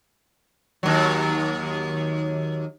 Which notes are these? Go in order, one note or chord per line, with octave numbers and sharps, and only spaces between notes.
D#2 F#3